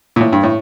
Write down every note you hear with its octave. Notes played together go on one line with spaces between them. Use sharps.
A#2
A2
G2
A2